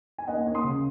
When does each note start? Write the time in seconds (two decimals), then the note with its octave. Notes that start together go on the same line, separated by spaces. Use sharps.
0.18 G#5
0.28 D#2 D#5 F#5
0.46 D#2
0.55 C6 D#6
0.64 C#3